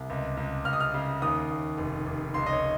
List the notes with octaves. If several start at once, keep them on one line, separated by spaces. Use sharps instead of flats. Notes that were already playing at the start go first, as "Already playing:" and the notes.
Already playing: C2
C#2
C#2
C#2 F6
D#6
F6
C#3
D#2 D#6
D#2
F1
F1
C#2 C6
D#5
C#5